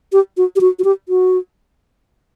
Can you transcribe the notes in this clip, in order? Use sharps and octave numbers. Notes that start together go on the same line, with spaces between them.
G4
F#4
G4
F#4
F#4
G4
F#4